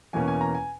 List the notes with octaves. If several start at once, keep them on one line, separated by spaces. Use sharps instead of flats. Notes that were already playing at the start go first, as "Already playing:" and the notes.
E2 B2 A#3 C#4 G#5
G#5
A#5
G#5